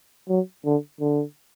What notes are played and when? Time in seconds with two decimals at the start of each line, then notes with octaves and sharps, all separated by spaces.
0.29 F#3
0.65 D3
1.01 D3